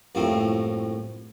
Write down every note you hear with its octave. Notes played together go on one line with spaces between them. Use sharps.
C2 F#2 A2 F3 A#3 C4